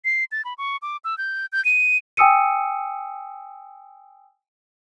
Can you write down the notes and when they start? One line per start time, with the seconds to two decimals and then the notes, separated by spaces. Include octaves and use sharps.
0.05 C7
0.32 A6
0.45 B5
0.58 C#6
0.82 D6
1.04 E6
1.18 G6
1.52 G6
1.65 D#7
2.17 G5 G#5 D#6 E6 C#7 D#7